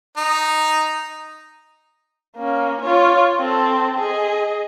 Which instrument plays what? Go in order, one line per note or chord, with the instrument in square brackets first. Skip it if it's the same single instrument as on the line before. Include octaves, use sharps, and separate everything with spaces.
[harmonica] D#4
[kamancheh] A#3 C#4
F4 C#5
C4 A4
G#4 D#5